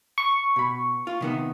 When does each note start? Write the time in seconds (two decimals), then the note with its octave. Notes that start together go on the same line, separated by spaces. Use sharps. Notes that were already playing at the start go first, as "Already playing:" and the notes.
0.18 C#6
0.56 B2 B5
1.07 F4
1.20 C3 D#3 B3